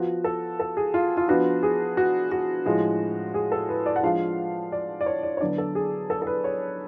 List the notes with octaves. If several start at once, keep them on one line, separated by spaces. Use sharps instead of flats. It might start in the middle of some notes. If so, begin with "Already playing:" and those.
Already playing: F3 B3 F4 F#4
A4
A4
G#4
F4
F4
F3 B3 D4 F4 F#4
G#4
F#4
F#4
A2 F3 G#3
G#4
A4
B4
D5
F#5
F3 G#3 D4 F4 F5
D5
D5
C#5
D5
C#5
D3 F#3 B3 D4 D5
A4
G#4
A4
A4
B4
C#5